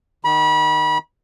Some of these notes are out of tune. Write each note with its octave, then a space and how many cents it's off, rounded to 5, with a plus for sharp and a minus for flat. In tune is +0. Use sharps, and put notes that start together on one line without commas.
D#3 -20 B5 -30